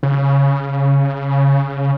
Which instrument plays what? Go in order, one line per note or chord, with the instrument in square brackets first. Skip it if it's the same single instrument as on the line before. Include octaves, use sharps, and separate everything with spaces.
[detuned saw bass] C#3